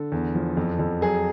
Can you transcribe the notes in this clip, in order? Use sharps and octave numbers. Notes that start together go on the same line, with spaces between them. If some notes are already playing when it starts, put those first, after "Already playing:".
Already playing: D3 A4
E2
F3
F2
F2
F#3 G#4